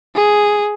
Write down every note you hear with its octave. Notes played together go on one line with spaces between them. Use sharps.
G#4